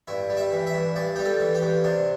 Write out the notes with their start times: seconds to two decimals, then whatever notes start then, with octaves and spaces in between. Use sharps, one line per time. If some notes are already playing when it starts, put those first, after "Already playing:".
0.08 G2 E4
0.30 G3
0.37 E5
0.52 E3
0.67 E5
0.74 G2
0.96 G2 D5
1.16 G3 G4
1.25 A4
1.40 E3
1.55 G4
1.62 G2
1.84 C3 D4